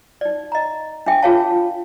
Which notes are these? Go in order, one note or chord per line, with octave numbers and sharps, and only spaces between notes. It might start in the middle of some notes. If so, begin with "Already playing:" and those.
D#4 D5
D#5 A#5
D4 G#4 E5 G5
F4 G#4 A#4 C#5 F5 A5
F4